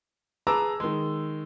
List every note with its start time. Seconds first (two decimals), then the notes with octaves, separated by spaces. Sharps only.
0.47 G#4 B4 A5 A#5 D6 E6
0.80 D#3 G#3